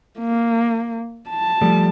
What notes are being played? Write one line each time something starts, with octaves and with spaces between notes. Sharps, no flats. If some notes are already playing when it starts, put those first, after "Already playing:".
A#3
A5
F3 G3 A3